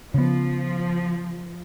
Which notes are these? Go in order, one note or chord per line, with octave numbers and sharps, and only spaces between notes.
C#3 F3 B3